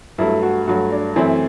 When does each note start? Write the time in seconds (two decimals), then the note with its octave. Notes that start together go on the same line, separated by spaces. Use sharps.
0.18 G2 F#3 A3 E4
0.43 F#4
0.67 G2 F#3 A3 F#4
0.92 D4
1.16 F#2 E3 A3 C4 E4